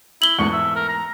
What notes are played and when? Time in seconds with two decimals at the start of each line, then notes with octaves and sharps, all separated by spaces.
0.22 E4 F#7 G7
0.38 E2 G#2 A3 C#6
0.53 E5
0.76 A#4
0.89 A#5